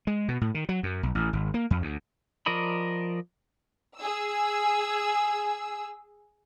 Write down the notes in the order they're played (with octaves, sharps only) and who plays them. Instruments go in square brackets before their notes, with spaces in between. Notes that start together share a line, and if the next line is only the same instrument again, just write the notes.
[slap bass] G#3
B2
A2
D#3
F#3
F#2
B1
A1
G#1
A#3
F2
D2
[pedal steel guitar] F3 A#4 D5 D#5 B5
[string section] G#4 E6